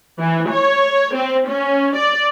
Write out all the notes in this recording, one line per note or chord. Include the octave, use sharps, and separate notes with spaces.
E3
C#5
C4
C#4
D5